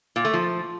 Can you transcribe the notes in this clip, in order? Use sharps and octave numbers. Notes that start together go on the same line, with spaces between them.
A#2
A3
F3